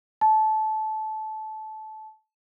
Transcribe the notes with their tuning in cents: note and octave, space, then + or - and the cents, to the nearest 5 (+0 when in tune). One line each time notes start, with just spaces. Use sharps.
A5 -20